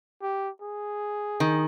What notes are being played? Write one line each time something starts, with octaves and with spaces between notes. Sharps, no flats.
G4
G#4
D#3